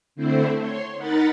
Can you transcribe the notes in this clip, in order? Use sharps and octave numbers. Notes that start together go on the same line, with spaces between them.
D3 A3 C4 E4 C5
C#5 C6
D#4 A#4 F#5 B5 A6